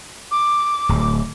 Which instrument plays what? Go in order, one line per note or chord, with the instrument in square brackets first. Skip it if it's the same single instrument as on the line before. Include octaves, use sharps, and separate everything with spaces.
[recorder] D6
[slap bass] D1